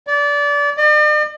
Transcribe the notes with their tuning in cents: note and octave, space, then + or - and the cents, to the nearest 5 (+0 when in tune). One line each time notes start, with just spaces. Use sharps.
D5 -25
D5 +45